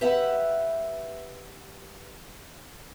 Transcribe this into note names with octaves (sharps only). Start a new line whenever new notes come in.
G4 B4 E5 F#5